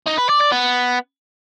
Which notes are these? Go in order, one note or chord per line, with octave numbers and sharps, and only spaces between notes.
D#4
B4
D5
D5
B3